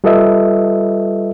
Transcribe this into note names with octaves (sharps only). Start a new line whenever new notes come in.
G3 F4 A4 B4 D#5 E5